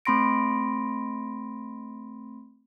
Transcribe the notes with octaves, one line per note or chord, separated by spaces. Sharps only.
A3 C4 B5 C6 A#6 D7